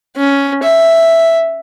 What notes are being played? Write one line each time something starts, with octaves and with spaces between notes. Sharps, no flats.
C#4
E5